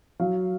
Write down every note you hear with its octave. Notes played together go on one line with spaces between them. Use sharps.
F#3 F5